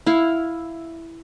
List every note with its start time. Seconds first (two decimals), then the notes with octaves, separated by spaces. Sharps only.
0.06 E4 F5